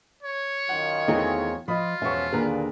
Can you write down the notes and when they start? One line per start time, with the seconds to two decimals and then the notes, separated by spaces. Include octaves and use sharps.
0.23 C#5
0.69 F#2 D#3 F4 F#5
1.08 E2 E3 A3 C4 D#4 G#4
1.68 F3 F4 D#5 B5 D#6
2.02 E1 F3 B3 C#4 E5 A5 C#6
2.33 D#2 A#2 D3 G#4 A#4 B4